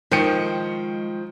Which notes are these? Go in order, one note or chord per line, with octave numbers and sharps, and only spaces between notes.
D#3 F3 G#3 G5 C#7